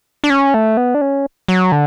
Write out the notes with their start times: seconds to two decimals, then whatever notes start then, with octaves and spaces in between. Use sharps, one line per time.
0.24 D4
0.30 C#4
0.54 A3
0.77 B3
0.95 D4
1.01 C#4
1.48 F#3
1.72 D3